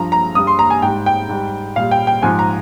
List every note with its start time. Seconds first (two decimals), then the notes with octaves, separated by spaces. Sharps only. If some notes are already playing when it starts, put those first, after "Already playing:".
Already playing: G2 F3 A#5
0.12 A#5
0.35 G2 G3 D#6
0.47 C6
0.59 A#5
0.70 G#5
0.82 G#2 G3 G5
1.06 G5
1.29 G#2 G3
1.76 A#2 G3 F5
1.91 G5
2.07 G5
2.22 G#2 F3 G#5
2.39 A#5